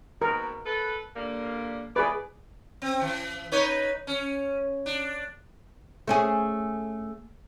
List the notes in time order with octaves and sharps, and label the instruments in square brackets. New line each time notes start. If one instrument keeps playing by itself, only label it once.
[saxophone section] G#2 B2 D#3 [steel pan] A#4
[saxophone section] A4 B4
D3 G3 A#3
[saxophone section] E3 D5 [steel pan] G#4 B4
[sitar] C4
E3
D#4 B4 C#5
C#4
D4
[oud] A3 C#4 G#4